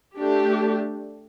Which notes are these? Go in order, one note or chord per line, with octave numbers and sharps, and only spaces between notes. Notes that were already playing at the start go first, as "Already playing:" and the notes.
A3 D4 G4